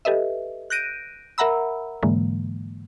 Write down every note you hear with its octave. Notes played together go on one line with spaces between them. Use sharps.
G4 A4 B4 D#5 E5
F#6 G6 A#6 D7 D#7
A#4 E5 F#5 A#5 B5 E6
G#2 D3 E3 G#3 A#3